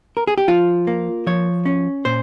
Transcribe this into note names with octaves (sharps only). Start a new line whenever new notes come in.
A#4
G#4
G4
F3 F4
A#3
F3 C#5
C#4
A#2 C5